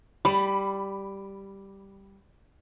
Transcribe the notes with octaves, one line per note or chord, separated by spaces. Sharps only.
G3 B5